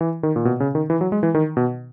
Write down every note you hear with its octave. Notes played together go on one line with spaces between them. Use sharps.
E3
D#3
A#2
B2
C#3
D#3
E3
F#3
G#3
E3
D#3
B2